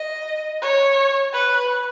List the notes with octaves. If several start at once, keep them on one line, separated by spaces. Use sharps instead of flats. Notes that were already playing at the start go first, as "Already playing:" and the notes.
Already playing: D#5
C#5
B4